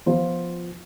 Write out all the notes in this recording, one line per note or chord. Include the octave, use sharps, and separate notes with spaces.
F3 B3 F4 C5